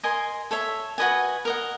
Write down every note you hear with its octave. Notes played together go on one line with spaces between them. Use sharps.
A#4 D#5 G#5 C6
A4 C#5 E5
F#4 B4 D#5 G#5
A#4 D#5 F#5